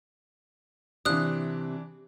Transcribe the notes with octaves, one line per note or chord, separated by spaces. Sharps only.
C3 E3 D4 D#6 F#6